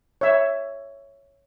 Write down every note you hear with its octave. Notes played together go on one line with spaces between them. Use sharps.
C#5 E5